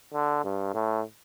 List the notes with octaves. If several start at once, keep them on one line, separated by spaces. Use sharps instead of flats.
D3
G2
A2